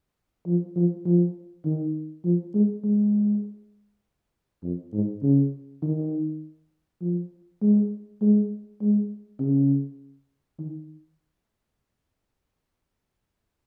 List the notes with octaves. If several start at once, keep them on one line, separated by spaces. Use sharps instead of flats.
F3
F3
F3
D#3
F3
G#3
G#3
F2
G#2
C#3
D#3
F3
G#3
G#3
G#3
C#3
D#3